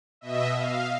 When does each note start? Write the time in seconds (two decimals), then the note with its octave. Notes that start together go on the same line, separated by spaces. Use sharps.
0.21 B2 D#5 E5
0.54 F5